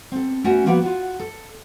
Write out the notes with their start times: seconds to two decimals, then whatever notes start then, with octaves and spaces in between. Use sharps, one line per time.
0.12 C4 A4
0.44 A3 B3 C#4 F#4 A#4
0.66 F3 A#3 B3 F#4
0.82 F4 F#4
1.19 A4